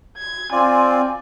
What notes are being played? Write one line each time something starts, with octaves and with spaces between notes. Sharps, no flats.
G#6
C4 F4 D5 G#5